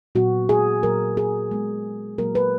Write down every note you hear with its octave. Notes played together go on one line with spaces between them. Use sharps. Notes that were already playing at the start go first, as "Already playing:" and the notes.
A#2 F#3 B3 F#4
G#4
A#2 F#3 A#3 A#4
G#4
A#2 G#3 B3
A#2 F#3 A#3 A#4
B4